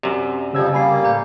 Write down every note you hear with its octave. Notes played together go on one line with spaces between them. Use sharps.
F#2 C3 D5
F2 C#3 F3 G3 E6 G#6
G3 A#3 G#5 B5 C7
A2 A4 A#5 G6